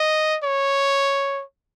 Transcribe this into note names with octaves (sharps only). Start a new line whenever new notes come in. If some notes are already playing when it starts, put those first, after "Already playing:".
Already playing: D#5
C#5